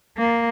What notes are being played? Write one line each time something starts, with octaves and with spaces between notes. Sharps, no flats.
A#3